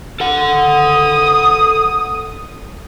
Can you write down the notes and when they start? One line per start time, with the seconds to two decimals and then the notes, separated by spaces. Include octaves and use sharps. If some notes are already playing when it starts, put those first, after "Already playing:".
0.20 A4 F#5
0.57 D#6